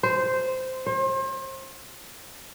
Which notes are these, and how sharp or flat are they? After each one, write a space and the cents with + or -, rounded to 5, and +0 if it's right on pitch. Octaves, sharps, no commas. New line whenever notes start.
C5 -10
C5 +35